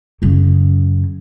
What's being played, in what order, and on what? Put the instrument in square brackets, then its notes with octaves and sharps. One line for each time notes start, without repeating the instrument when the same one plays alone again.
[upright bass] F#2 C#3